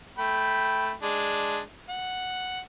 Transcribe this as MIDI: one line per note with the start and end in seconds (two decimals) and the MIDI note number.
0.18 0.92 57
0.18 0.92 79
0.18 0.92 83
1.03 1.59 56
1.03 1.59 62
1.89 2.60 78